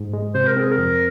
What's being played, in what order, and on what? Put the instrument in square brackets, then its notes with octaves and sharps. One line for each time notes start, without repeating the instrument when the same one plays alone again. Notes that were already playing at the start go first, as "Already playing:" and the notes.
Already playing: [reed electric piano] G#2
G#3
[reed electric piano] C3 [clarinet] C5
[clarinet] A#4
[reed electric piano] C4 [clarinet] G#4
[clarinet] A#4
[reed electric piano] F2